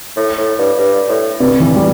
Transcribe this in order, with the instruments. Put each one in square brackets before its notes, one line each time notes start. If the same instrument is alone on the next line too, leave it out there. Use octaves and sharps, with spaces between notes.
[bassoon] A2
A2
G2
G2
A2
[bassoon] G2 [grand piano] C3
[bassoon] G2 [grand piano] E3
[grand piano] G3